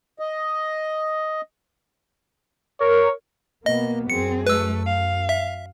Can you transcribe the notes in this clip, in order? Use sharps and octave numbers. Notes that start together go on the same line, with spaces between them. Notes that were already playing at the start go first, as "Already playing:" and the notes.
D#5
A#4 C#5
B2 A#3 B3 D#5
F#2 C4 G#4 C#7
A3 B4 E6
F5
E5